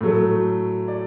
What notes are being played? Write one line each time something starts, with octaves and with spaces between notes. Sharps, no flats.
A2 F#3 A3
D5